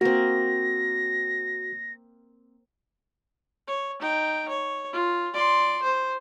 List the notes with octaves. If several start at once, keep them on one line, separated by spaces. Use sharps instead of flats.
A#3 C4 F#4 A#6
C#5
D#4 G5
C#5
F4
D5 C6
C5